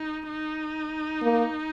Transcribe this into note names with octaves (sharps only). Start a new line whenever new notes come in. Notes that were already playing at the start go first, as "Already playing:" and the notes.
Already playing: D#4
D#4
A#3